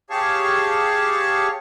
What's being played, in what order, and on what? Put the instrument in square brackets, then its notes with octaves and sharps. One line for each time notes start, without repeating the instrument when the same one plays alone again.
[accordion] G4 G#4 C#5 F5 A5 C#6